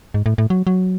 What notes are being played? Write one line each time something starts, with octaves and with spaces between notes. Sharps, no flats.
G#2
A2
A2
F#3
F#3